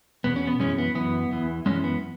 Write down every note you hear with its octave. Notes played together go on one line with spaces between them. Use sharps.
E2 B2 B3
C#4
B3
F#2 E3 G#3 C#4
B3
F#2 E3 B3
E2 E3
F#2 E3 G#3 C#4
B3